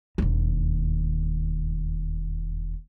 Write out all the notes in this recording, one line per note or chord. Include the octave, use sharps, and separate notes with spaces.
E1 D#2